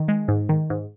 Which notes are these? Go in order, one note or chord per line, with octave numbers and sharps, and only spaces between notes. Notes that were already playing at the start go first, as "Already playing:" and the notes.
Already playing: D#3
G#3
G#2
D#3
G#2